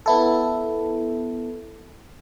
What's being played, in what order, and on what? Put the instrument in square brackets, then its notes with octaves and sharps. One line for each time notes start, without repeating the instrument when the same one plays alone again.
[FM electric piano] B3 E4 A4